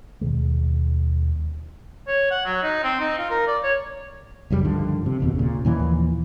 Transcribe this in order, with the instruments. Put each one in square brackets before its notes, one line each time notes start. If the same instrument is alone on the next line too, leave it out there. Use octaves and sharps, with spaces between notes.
[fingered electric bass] D#2 B2 D#3 G#3
[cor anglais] C#5
F#5
F#3
D#4
C4
D#4
F4
A#4
D5
C#5
[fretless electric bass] C#2 F#2 F3 G3
G2 D3 D#3 F3
C3
F#1 D#2 B2
A#2 C#3
D#2 A#2 E3 F3